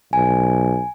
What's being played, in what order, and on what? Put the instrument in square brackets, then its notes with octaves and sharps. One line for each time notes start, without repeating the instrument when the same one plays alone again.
[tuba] B1 [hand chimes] G#5